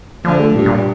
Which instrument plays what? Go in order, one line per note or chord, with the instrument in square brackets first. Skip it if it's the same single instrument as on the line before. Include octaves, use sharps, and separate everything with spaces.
[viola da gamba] D3 [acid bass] F3
[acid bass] A3
[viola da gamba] G2 [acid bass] A#2
[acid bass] A#2